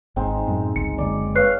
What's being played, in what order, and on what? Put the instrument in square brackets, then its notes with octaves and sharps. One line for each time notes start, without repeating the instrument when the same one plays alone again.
[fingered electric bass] G#1 [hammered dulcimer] G#3 C4 D#4
[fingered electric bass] F#2 A2
[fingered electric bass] G1 C#2 [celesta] C#7
[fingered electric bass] F#1 D3 G#3 [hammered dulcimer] D5
[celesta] B4 F#6 C7 [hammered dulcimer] C#5 F5